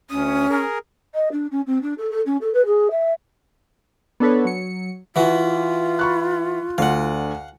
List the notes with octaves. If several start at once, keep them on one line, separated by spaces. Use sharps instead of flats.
D2 C#4 D#6
G#4 A#4
D#5
D4
C#4
C4
D4
A4
A4
C#4
A4
B4
G#4
E5
B3 D4 A4 B4 C#5
F#3 C#7
E3 F4 F#4
B5 C#6 F#6
D2 D3 F5 F#5